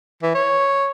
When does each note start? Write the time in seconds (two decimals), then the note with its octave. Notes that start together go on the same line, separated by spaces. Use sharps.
0.23 E3
0.35 C#5